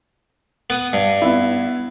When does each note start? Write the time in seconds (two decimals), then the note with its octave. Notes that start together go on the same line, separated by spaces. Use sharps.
0.70 B3 D#6
0.93 G2
1.22 B3 E4